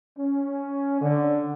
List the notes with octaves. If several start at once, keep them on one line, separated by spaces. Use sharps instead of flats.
C#4
D3